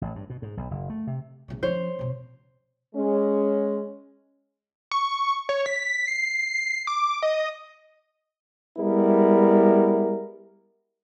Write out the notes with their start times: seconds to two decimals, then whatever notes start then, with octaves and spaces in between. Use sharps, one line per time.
0.01 A1
0.16 G2
0.30 B2
0.42 G#2
0.57 B1
0.71 F#1
0.90 A3
1.07 C3
1.48 A#1 C#3
1.63 F3 C#4 C5 C#5
1.99 F2 B2
2.95 G#3 C#4
4.91 C#6
5.49 C#5
5.66 B6
6.07 C7
6.87 D6
7.23 D#5
8.79 G3 G#3 B3 E4 A#4